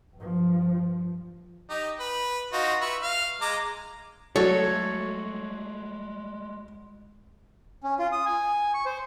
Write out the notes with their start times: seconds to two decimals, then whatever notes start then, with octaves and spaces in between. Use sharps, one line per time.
0.16 G2 F3
1.70 D#4 G4
2.00 B4
2.53 D#4 F4 F#4
2.81 B4 E5 C#6
3.02 F5
3.41 G#3 A#5 D6
4.36 F#3 G#3 A3 A4 C#5
7.83 C#4
7.99 F4
8.12 D#6
8.26 G#5
8.74 C#6
8.86 C5